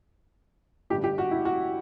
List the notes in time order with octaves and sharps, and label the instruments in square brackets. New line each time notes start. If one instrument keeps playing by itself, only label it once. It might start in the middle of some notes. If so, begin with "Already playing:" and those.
[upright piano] A1 G2 D3 G4
G4
F#4
E4
F#4